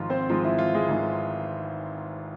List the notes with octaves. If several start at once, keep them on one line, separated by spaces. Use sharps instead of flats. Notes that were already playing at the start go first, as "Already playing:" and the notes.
Already playing: G#1 G#2 F3 F4
C4 C5
G#1 G#2 F3 G#3 F4
E3 E4
F3 F4
G#3 G#4
G#1 G#2 G#3